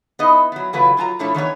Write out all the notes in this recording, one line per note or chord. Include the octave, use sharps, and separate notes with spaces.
B3 D#4 E4 D#5
F#3 B3
C#3 E3 F#3 A3 F4 B4
F#3 F4 A5 A#5
B2 F3 A3 D4 E4 C#5
D#3 E3 B3 C#5